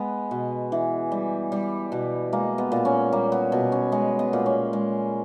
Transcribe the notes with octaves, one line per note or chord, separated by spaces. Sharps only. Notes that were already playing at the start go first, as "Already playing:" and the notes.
Already playing: G#3 B3
B2
E3
G3
G3
B2
G#3 A#3
B3
A#2
C#4
G3 A#3
B3
B2
C#4
G#3 B3
B3
A#2
C#4
G#3